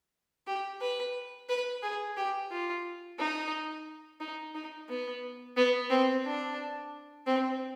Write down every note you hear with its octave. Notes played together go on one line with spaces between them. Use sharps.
G4
B4
B4
G#4
G4
F4
D#4
D#4
D#4
B3
B3
C4
D4
C4